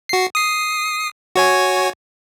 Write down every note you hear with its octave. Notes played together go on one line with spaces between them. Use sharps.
F#4 C7
D#6 C7
F#4 C#5 G#5